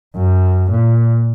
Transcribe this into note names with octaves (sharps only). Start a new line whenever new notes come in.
F#2
A#2